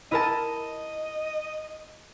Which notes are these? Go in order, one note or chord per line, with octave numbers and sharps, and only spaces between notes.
E4 A#4 D#5 A5